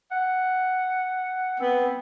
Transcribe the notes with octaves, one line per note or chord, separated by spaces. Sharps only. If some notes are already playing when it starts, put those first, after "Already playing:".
F#5
B3 C4